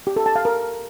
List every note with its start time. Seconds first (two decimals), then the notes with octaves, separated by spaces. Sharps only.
0.07 G4
0.16 A4
0.26 A5
0.36 F5
0.45 A#4